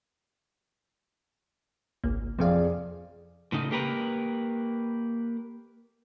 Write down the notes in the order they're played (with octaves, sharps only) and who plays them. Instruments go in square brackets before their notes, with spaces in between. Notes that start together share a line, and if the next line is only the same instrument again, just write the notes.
[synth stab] G#1 C#2 A#3
[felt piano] F2 G#4 D5 [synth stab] C3 F3 F5
[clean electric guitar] A2 C#3 D#4
A#3 G4 A#4 B4